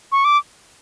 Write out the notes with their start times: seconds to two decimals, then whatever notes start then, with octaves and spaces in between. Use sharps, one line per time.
0.12 C#6
0.25 D6